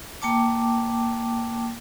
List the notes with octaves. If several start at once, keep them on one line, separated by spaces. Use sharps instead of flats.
A#3 G5 A5 D6